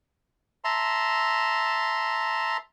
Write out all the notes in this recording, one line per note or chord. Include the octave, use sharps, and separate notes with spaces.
E5 A5 A#5 C6